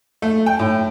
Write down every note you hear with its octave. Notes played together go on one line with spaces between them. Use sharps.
A3
G5
A2